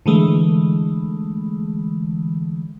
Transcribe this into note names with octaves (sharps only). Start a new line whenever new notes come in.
D3 E3 G#3 A3